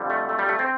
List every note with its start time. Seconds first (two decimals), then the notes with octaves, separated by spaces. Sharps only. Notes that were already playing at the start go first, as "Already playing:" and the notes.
Already playing: F2 D3 G3
0.10 A3
0.29 A3
0.39 G3
0.49 A3
0.59 C4